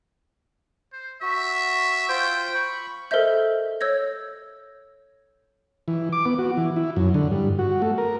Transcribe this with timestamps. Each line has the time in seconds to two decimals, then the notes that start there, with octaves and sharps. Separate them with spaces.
0.93 C5
1.22 F#4 E5
2.09 F4 C5 G5
2.55 B5 C#6
3.11 A4 A#4 C5 D#5 E5 G6
3.81 C#5 E6 G6 G#6 A#6
5.88 E3
6.12 D6
6.26 B3
6.39 F#4
6.57 E3
6.76 E4
6.96 F#2
7.14 D3
7.31 G2
7.59 F#4
7.82 A3
7.98 A#4